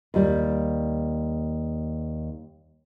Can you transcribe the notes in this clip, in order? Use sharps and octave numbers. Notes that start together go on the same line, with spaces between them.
D#2 G3